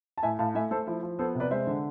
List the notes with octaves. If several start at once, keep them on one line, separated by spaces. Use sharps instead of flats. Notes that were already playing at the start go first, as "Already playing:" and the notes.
A5
A2 E5 G#5
A2 F5 A5
A3 E5 G#5
A3 A4 C5
F3 E4
F3
B3 A4 C5
C3
B4 D5
G#3 C5 E5
D3